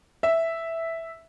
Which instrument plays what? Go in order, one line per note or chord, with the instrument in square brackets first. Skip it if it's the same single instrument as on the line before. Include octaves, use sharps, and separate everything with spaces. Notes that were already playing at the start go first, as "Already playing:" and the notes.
[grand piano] E5